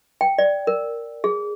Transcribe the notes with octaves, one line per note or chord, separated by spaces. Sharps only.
G5
D5
A#4
G#4